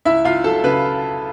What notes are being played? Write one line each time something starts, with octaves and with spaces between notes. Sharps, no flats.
C#2 E4 E5
C#2 F4 F5
F#3 A4 A5
C#3 B4 B5